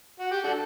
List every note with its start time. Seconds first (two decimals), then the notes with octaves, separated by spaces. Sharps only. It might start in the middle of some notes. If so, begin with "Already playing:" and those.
0.20 F#4
0.32 G4
0.44 D4 F#4 A4